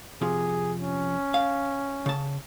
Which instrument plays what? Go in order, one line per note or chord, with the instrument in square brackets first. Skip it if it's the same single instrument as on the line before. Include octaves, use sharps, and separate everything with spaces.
[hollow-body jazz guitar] F2 C3 F3 [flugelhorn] G#4
[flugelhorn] C#4
[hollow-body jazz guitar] F5
C#3 A5